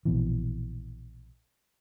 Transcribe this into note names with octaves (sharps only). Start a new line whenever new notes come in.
A#1 B2 E3